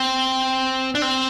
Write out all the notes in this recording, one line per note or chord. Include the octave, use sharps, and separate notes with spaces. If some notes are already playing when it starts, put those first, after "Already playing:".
Already playing: C4
D4
C4